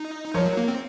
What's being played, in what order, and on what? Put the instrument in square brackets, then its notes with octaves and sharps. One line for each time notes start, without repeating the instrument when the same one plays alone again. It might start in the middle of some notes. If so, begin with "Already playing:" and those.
Already playing: [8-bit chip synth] D#4
[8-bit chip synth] F3 [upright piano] A#4 C#5
[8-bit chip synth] F#3
A#3
C4